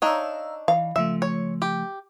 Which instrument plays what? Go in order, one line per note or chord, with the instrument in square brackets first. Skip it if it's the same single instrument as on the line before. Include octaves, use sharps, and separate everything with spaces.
[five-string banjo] D4 D#4 C#5 [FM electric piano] F5 A#5 E6
[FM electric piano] E3 [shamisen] F5
[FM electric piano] C#3 F3 A3 [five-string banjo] E5
[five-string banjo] C#5
G4